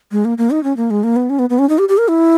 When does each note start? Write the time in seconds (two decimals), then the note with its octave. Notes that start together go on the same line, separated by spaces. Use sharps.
0.12 G#3
0.25 A#3
0.38 A#3
0.51 D#4
0.64 C#4
0.77 A#3
0.91 G#3
1.04 A#3
1.16 B3
1.30 C#4
1.39 B3
1.50 B3
1.59 C#4
1.69 D#4
1.78 G4
1.89 G4
1.98 A#4
2.08 E4